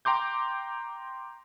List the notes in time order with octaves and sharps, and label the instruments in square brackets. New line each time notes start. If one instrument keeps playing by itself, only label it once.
[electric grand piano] G5 A#5 C6 D6 G6